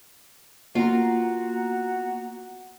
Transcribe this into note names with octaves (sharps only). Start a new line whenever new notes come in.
A#3 B3 F4 F#4 A#5